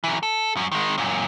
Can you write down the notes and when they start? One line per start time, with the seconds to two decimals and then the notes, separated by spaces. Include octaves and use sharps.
0.04 E3 F#3
0.23 A4
0.57 F#2 F#3
0.72 D#3 G#3
0.98 F#2 A#2